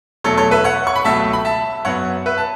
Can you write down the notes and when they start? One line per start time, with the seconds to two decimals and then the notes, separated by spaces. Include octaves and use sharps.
0.24 E2 B2 F#3 A3 A4 C#5
0.37 A4 C#5
0.51 B4 E5
0.64 C#5 F#5
0.87 C#6
0.96 B5
1.04 C#2 B2 F#3 A3 E5 A5
1.33 B5
1.45 E5 A5
1.85 F#2 F#3 B3 C#5 F#5
2.26 B4 E5
2.38 A5